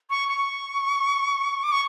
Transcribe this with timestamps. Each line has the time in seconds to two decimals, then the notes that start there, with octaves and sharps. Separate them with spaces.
0.10 C#6
0.29 C#6
1.64 D6
1.72 C#6